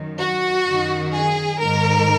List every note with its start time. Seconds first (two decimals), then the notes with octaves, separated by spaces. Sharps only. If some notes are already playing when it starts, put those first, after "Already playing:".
Already playing: F#2 D#3
0.19 F#4
0.66 F#2 D#3
1.13 G#4
1.60 G#2 D#3 A#4